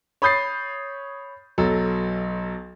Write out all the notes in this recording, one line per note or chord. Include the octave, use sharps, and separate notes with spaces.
C#5 B5 D#6 G6 A6 C7
B1 F#3 A4